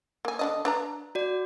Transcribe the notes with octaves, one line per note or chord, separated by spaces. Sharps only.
A#3 G#5
D3 D4 D#5
D4 B4 A#5
F#4 D5